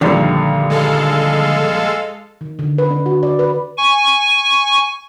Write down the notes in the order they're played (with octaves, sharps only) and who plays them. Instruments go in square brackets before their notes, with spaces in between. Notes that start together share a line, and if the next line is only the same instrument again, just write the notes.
[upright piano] A#1 G2 D5 [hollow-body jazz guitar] D3 D#3
[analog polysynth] G#3 A4 F5
[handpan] D#3
D3
B4
D4
F#4
D5
B4
[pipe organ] G#5 C#6